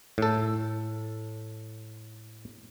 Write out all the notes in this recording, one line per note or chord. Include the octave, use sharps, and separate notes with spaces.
A2 A4